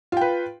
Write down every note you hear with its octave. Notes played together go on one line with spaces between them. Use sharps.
F4 B4 G5